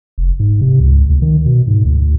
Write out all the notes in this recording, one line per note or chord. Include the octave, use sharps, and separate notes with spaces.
F1
G#2
C3
C#2
D2
D#3
B2
G#2
D2